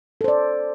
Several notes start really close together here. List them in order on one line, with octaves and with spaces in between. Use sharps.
A4 C5 D5